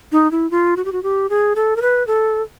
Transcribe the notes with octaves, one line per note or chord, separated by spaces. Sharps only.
D#4
E4
F4
F#4
G4
F#4
G4
G#4
A4
A#4
B4
A4